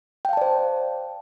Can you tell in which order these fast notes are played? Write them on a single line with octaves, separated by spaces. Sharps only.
G5 F5 A5 D5 C5